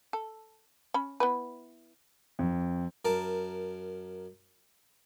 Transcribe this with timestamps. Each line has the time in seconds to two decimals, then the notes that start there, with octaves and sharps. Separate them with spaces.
0.13 A4
0.94 C#4 B5
1.20 B3 E4 B4
2.39 F2
3.05 F#2 A#4 A5